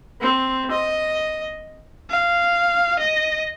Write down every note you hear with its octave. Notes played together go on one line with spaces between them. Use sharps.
C4
D#5
F5
D#5